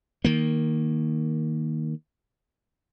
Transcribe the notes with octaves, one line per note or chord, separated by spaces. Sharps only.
D#3 A#3